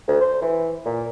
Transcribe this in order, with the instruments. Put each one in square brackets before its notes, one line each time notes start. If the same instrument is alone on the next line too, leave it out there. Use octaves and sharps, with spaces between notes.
[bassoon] D2
C5
E3
A#2